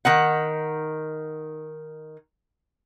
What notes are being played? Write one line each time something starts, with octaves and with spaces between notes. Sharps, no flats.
D#3 D#4 F#5